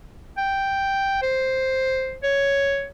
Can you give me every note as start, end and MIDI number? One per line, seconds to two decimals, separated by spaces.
0.37 1.18 79
1.22 2.16 72
2.23 2.86 73